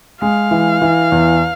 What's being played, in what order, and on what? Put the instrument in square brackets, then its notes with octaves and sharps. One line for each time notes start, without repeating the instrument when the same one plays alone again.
[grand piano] G#3 [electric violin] F5
[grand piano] E3
E3
E2